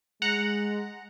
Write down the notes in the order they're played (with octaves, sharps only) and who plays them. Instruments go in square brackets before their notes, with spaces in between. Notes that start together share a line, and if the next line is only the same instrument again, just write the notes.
[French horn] G#3 [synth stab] F#5 A#5